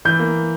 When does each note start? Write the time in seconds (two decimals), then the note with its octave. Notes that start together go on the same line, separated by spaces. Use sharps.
0.05 E3 G6
0.19 A#3